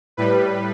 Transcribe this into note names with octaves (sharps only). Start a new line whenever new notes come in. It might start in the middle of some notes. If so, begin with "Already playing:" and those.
A2 G3 B4